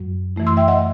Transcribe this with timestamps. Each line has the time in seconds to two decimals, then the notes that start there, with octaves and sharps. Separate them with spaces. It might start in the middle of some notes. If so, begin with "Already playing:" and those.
Already playing: F#2 F#3
0.36 F#2 E3 A3 E4
0.47 C6 E6
0.57 E5 G5
0.68 D#5 F#5